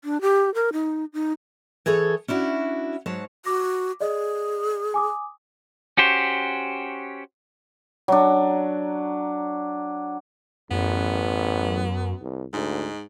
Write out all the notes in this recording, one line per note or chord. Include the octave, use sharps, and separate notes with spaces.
D4
G4
A#4
D#4
D#4
E3 G#4 A4 C#5
C#4 D4 E4 F#4
G#2 F#3 C#5 A5
F#4 D6 A#6
G#4 D5 D#5
G#5 D6 D#6
C#4 F#4 G4 C5
F#3 D4
A1 F#2 B3
C2
D2 G#2